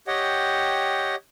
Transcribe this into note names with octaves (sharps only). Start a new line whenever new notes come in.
G4 C#5 D#5 F#5 G5